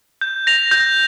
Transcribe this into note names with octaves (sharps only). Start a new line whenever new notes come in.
G6
A#6 F7
G6